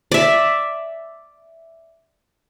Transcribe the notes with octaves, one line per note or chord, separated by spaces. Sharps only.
D5 E5